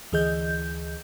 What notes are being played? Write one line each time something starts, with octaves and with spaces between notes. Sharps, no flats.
D2 E3 G#4 D#5 G6